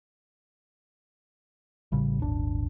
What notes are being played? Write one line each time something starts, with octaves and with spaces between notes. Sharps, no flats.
A1 C#3 G3
D#1 G#1 D4